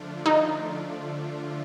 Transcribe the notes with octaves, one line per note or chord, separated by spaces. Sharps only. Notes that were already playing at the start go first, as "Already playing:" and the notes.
Already playing: D3 F3 A3 D4 F4
D#4